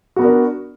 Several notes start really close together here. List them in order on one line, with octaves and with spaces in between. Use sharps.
F#4 B3 A#4 D4